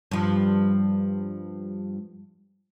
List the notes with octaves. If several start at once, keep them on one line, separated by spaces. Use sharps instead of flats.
G2 F3